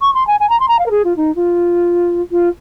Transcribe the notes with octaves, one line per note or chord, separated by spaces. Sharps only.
C#6
C6
G#5
G#5
A#5
C6
A#5
F5
A#4
G#4
F4
D#4
F4
F4